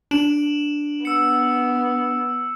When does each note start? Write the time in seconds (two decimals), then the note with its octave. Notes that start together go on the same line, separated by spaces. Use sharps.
0.11 D4 D7 E7 F#7
1.05 B3 E6 C#7